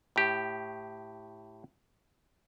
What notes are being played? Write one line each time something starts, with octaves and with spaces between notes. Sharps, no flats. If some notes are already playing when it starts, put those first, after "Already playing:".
A2 G4